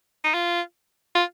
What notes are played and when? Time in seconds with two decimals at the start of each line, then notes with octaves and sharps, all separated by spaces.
0.24 D#4
0.34 F4
1.15 F4